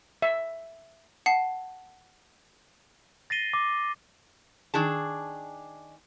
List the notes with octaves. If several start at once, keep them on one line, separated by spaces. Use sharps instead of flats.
E5
F#5 A5 C7
A6 A#6 C7 D#7 G7
D6
D#3 D4 G#4 A5